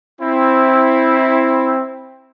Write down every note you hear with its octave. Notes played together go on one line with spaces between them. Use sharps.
C4 E4